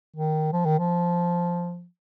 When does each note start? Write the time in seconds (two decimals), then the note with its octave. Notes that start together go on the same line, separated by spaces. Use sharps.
0.16 D#3
0.53 F3
0.66 D#3
0.79 F3